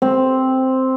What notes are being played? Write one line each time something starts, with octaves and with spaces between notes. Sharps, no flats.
C4